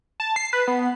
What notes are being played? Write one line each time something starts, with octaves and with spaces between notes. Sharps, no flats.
A5
C7
B4
B3